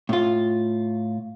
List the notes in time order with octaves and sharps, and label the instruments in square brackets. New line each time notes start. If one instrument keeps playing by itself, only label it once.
[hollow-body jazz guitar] A2 F4